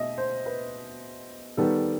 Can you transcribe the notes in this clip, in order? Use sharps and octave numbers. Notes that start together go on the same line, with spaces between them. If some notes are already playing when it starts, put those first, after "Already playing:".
Already playing: B2 D#5 E5
C5
B4
D#3 G3 B3 A4